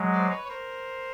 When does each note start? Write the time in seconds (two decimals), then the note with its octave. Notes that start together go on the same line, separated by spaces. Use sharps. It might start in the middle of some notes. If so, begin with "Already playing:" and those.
Already playing: F#3 G#3
0.11 C5 D5
0.30 B4 C#5
0.45 C#5
0.49 A#4 C5